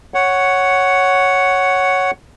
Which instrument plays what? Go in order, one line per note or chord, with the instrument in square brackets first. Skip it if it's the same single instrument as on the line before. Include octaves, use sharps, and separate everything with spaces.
[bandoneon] C#5 F#5